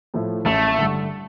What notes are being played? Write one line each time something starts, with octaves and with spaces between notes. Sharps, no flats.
A2 F3 A3
A1 A3
G2 D3